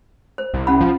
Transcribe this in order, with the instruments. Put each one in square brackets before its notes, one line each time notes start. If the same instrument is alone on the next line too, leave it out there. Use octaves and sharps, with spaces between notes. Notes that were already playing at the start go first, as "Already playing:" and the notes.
[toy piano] C5
[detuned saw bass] C2
[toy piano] C#4 F#5 B5
[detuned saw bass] F3